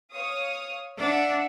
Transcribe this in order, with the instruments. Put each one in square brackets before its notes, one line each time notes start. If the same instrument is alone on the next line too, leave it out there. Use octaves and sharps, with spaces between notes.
[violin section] C#5 F5 D#6
[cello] D4 [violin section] E5 F#5